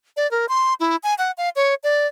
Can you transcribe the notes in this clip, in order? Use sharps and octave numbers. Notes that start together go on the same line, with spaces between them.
D5
A#4
C6
E4
G#5
F#5
F5
C#5
D5